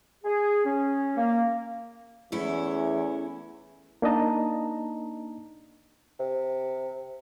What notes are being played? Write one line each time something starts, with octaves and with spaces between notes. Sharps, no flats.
G#4
C#4
A#3
E2 A3 C#4 E4
A#3 D4 D#4 D#5 A5 A#5
C3